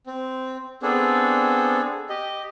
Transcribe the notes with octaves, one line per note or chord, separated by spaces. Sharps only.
C4
B3 C4 D4 G#4 A4
G4 D#5